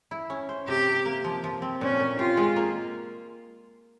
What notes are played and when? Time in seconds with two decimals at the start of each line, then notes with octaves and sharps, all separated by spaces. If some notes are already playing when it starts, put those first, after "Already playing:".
0.11 E4
0.30 C#4
0.49 C5
0.68 C3 G4
0.86 C3
1.05 A#3
1.24 F3
1.44 F3
1.62 C4
1.81 A#2 C#4
2.00 A#2
2.19 F4 G4
2.37 G#3
2.56 A#3